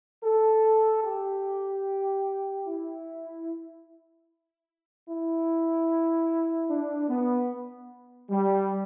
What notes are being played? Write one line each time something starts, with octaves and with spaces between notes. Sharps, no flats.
A4
G4
E4
E4
D4
B3
G3